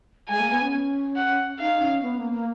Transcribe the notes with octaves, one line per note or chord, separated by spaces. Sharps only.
G#3 G#5
A#3
B3
C#4
F#5
D#4 F5
C#4
B3
A#3
A#3